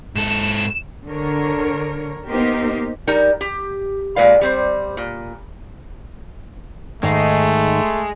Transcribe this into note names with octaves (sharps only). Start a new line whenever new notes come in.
G#2 A4 E7
D3 A#4 C#5
A#3 B3 D#4 G4 A#4 C5
G3 D#4 A#4 A#5
G4
A#2 G#3 B4 D5 F5
G3 C4 C5
A#2
G#2 D#3 G#3 A3